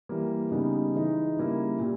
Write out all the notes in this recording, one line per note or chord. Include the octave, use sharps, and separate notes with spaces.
E3 G3 A#3
C#3 G3 B3 D#4
E3 G#3 D#4
C#3 G3 A#3 E4
A#2 G3